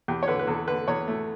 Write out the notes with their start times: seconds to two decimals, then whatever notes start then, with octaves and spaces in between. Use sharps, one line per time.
0.08 E2 G4
0.23 C#5
0.28 D3 B4
0.39 B4
0.47 E2 A4
0.68 D3 B4
0.88 E2 C#5
1.08 A3